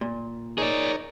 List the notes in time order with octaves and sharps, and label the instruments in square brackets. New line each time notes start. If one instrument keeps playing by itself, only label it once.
[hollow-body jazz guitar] A#2
[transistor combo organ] D#4 A#4 C#5 [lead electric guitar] G#4 D5